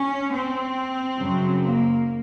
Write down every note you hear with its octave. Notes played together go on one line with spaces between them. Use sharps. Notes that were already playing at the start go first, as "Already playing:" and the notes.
Already playing: C#4
C4
F#2 C#3 F#3
A#3